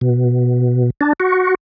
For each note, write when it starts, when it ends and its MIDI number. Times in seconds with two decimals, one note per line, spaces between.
0.01 0.90 47
1.01 1.13 62
1.20 1.55 66